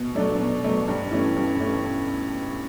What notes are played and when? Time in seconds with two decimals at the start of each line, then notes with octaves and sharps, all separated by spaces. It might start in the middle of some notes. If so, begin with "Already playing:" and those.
Already playing: B2
0.15 F#3 A3 D4
0.39 B2
0.63 F#3 A3 D4
0.88 G2
1.11 E3 A3 C#4
1.36 G2
1.60 E3 A3 C#4